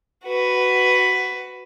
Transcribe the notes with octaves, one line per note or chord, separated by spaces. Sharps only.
F#4 B4